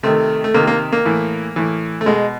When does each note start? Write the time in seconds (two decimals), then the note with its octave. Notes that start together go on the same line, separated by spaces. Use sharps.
0.03 C3 D#3 A3
0.44 A3
0.54 C3 D#3 A#3
0.67 A#3
0.92 A#3
1.05 A2 E3
1.56 A2 E3
2.01 A3
2.06 B2 G#3